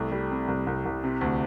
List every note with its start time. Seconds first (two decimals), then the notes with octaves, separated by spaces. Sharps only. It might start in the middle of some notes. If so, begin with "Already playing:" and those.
Already playing: C2 A3
0.12 G3
0.31 C3
0.48 C2
0.67 C2
0.85 C2
1.04 C3
1.21 D2